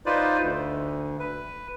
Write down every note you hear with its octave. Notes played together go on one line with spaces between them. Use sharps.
D#4 F4 B4 C5 D5
D2
B4